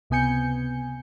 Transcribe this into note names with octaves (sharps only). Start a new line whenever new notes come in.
C#2 C3 B3 G#5 G6 C#7